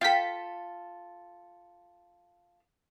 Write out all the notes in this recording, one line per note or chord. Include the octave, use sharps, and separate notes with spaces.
F4 A4 F5 G5 B6